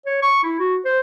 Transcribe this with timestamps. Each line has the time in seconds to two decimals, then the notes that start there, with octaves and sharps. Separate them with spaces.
0.06 C#5
0.22 C#6
0.43 E4
0.59 F#4
0.85 C5